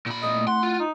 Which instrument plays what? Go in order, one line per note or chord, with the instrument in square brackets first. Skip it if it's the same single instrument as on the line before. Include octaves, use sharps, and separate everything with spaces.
[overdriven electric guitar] A#2 B5
[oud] A3 C4 E4 [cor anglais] D#5
[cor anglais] F#5 [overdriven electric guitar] C6
[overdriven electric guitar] F4
[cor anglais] D#4